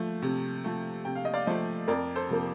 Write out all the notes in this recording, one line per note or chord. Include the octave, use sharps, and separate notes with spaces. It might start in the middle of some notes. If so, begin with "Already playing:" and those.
Already playing: F3 A3
C3
F3 A3
C3 G5
F5
D#5
D5 F5
F3 A3 C5 D#5
F2 A#4 D5
A4 C5
C3 F3 A#3